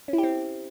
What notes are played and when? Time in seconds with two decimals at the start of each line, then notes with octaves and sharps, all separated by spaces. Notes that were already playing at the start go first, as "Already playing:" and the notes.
0.08 C#4
0.13 E4
0.18 G4
0.23 C4